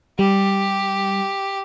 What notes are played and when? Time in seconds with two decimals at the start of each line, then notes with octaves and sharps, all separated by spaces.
0.19 G3 G4